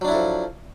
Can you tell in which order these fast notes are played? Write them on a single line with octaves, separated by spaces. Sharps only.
F#3 D4 E4 A4 F3